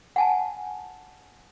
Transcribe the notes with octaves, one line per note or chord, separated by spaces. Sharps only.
F#5 G#5 A5